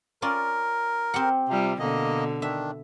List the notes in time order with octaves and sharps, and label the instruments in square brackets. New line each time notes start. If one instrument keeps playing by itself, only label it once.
[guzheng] C#4 F4 D5 [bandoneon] A#4
[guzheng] C4 G4 F#5
[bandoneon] C3 [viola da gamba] G3 F4
[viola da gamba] B2 D3 [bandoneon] A#3 D#5
[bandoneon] D#3 D4 [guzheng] E5